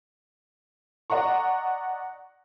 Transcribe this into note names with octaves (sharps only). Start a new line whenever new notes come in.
D5 D#5 F#5 A#5 C#6